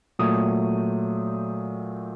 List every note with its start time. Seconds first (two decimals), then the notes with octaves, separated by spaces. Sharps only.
0.19 A#2 F#3 A3 D#6